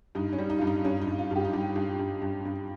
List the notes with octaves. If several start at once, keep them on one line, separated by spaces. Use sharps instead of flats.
G2 D#4
C#4
G3
D#4
G2 F4
D#4
G2 C#4
D#4
G2
F4
G2 G4
D#4
G2 F4
G2
G2
G2
G2